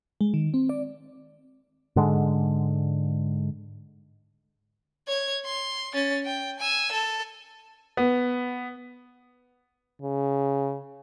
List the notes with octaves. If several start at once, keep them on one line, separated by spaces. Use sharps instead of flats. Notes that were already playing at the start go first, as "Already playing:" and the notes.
G#3
D#3
C4
D5
G#2 D3 G#3
C#5 G#6
C6
C#4 A6
G5
G#5 E6
A4
B3
C#3